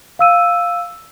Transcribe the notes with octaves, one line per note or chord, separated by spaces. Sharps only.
F5 E6 D#7